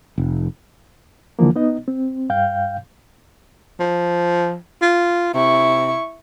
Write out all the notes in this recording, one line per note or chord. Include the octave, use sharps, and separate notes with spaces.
F1
C#2 D3 E3 F3 A#3
B3 D#4 D#5
C4
G2 F5 G5 G6
F3
F4
C3 E4 C#6